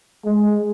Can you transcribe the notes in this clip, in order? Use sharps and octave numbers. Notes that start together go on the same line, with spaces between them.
G#3